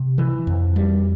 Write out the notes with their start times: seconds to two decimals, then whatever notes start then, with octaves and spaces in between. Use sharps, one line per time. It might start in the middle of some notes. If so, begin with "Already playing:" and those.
Already playing: C3
0.18 E3
0.47 F2
0.76 G3